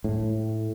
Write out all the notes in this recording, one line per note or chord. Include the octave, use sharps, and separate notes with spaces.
A2